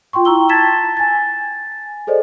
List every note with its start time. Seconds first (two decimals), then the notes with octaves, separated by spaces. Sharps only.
0.13 F4 G5 C6 C#6
0.25 E4 G5 A#5 C#6 E6 G7
0.49 A5 G#6 A6 B6 E7
0.97 G#5 A6
2.07 G#4 A4 C5 D5 D#5